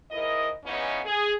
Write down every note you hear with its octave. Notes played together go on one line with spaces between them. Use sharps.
G#2 E4 A#4 D#5
C#3 E3 B3 C#4 D#4
G#4